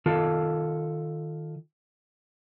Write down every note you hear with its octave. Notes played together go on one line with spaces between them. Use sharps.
D#3 F4 A4